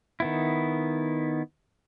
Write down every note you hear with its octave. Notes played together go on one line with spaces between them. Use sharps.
D#3 B3 E4